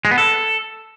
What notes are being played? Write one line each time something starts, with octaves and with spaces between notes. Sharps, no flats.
G#3
B3
A4